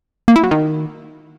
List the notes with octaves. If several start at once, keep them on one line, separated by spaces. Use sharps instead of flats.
A#3
E4
F#3
D#3